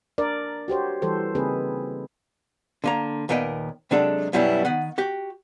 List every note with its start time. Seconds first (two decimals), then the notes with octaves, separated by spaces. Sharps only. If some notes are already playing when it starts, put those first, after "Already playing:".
0.18 D4 A#4 D5
0.68 F#4 G4 C5 C#5
1.02 E3 G3 A4 C5
1.35 C#3 A#3 C4 D#4 G#4 B4
2.84 D3 A#3 A#5
3.29 D#2 A#2 B3 A#4 D#5 G5
3.91 C3 F#3 G#3 D4 G4 A4
4.33 F#2 B2 F#3 G3 B3 E4
4.65 D#3 B3 F#5
4.98 F#4 G4